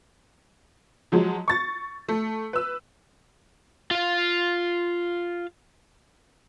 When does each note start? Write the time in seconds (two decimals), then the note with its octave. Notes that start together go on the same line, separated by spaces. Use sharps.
1.12 F3 F#3 G#3
1.48 C#6 A6
2.09 A3
2.53 B4 E6
3.91 F4 F5